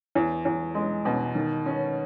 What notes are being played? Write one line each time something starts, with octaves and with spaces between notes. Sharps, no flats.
E2
E2
G#3
B2
D#3
C#4